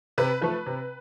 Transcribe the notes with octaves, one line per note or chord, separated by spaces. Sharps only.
C3 B4
F3 A3 B4
C3